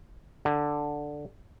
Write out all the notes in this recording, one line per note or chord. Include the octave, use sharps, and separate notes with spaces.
D3